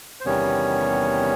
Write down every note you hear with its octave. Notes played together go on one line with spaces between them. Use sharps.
C5
E2 C3 D#3 G3 B3 C#4 C#5